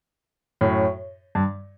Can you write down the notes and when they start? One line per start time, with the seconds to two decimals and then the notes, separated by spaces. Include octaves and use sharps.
0.61 F#2 A2
1.35 G2